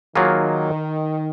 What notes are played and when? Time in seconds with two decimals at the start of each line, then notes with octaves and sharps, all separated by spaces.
0.15 D#3 F#3 A#3 F4 G#4